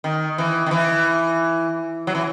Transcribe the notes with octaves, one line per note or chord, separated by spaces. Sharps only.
D#3
E3
D#3
E3
F#3
E3